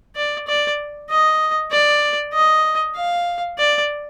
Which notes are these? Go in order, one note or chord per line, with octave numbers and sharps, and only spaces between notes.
D5
D5
D#5
D5
D#5
F5
D5